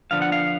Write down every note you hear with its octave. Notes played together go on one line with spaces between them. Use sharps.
D3 F3 B3 D4 F5
F#5
F5